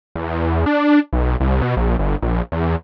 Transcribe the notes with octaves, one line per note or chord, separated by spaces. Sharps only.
E2
D4
B1
C2
B2
A#1
G1
A#1
E2